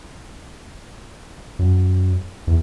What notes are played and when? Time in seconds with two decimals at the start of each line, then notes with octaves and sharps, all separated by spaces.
1.59 F#2
2.47 E2